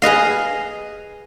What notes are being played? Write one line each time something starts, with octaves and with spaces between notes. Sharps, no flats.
G#4 B4 D#5 F5